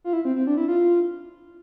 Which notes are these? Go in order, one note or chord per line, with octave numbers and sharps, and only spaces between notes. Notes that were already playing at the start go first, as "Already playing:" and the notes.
F4
E4
C4
C4
D4
E4
F4